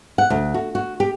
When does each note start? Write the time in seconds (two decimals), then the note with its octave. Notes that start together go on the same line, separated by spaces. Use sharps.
0.18 F#5
0.30 D2
0.54 F#4
0.75 F#4
1.00 G4